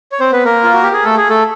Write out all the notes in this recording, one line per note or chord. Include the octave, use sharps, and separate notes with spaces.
C#5
C4 C5
B3 B4
A#3 A#4
F4
F#4
G4
G#4
A3 A4
G#4
A3 A4